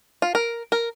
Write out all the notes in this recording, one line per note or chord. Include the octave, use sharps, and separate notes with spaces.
F4
A#4
A#4